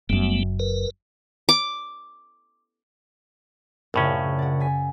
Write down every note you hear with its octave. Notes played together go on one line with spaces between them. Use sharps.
F#1 F#2 G3 A3 B3
A#4 B4
D6
A#1 F#2 A2 C#3 C#4
D5 F#5
G#5 B6